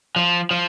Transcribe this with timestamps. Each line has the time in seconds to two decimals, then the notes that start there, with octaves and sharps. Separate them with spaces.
0.16 F3
0.51 F3